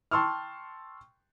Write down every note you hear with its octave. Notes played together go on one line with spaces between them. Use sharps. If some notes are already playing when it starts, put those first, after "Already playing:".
G5 A5 C6 C#6 E6 F6